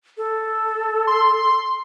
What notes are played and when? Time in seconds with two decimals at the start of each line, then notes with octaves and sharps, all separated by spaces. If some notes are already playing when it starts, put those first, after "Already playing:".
0.17 A4
1.07 C6